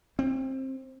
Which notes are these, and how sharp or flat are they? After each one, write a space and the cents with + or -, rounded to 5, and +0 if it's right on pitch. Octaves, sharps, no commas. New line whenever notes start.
C4 +20